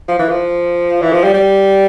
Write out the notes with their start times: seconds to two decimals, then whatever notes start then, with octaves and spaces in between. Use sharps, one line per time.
0.08 F3
0.19 E3
0.29 F3
1.02 E3
1.12 F3
1.24 G3
1.34 G3